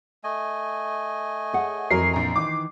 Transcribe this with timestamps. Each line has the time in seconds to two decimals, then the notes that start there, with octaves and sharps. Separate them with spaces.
0.24 A3 D#5 G#5
1.53 G#4 C#5 F#5
1.90 F2 E3 F#3 A#4 C7
2.14 A#1 A#5
2.36 D#3 E3 D#4 D6